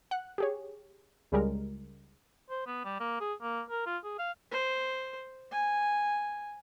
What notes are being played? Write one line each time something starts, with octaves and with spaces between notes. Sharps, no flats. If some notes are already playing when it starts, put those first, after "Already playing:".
F#5 F#6
G4 G#4 C#5
C#2 C#3 G3 G#3 A#4
C5
B3
G3
A#3
G#4
A#3
A#4
F4
G#4
F5
C5
G#5